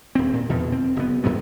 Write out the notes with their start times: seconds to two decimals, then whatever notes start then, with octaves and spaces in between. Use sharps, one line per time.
0.15 D#1 C4
0.34 A#2
0.49 E2 B2
0.72 C4
0.96 F#1 B3
1.24 F#2 A#2 F#3 B3